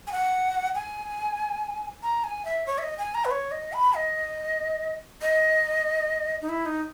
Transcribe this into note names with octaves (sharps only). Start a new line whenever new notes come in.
G#5
F#5
G#5
A#5
G#5
E5
C#5
E5
D#5
G#5
A#5
B4
C#5
D#5
B5
D#5
D#5
D#4
E4
D#4